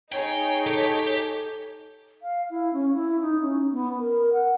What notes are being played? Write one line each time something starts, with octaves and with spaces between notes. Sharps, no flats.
D#4 G#4 C#5 G5
G4 A4
F5
E4
C#4
E4
D#4
C#4
B3
A#4
F#5